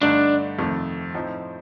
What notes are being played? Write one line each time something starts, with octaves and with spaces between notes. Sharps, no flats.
G2 D3 A3 D4 D#4
F2 C3 D#3 A3
A2 F3 C4 D#4